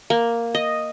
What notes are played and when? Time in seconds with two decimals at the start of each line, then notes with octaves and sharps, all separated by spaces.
0.10 A#3
0.55 D#5